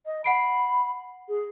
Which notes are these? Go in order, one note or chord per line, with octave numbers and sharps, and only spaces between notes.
D#5
F#5 B5 C7 D7
G#4